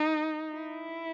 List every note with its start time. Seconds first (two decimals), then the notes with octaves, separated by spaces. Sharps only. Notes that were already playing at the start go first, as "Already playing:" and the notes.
Already playing: D#4
0.54 E4